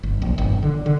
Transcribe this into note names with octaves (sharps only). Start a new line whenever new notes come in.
G1
A#1
G1
D3
D3